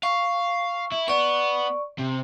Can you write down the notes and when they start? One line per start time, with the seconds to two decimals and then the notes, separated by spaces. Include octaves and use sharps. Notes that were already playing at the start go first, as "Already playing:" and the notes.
0.03 F5 C#6
0.92 E4
1.08 B3 D5 C#6
1.98 C3